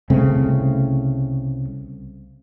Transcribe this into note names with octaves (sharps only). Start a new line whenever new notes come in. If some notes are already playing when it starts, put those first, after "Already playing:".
C2 C#3 A3 C4